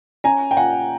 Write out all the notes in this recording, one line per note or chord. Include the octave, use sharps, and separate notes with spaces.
C#4 G#5 A#5
G5
A#2 F#5 G#5